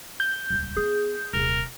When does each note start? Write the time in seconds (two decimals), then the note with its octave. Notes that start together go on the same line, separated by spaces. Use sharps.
0.20 G6
0.50 D#1 C#2
0.77 B3 G#4
1.33 D#1 C3 A#4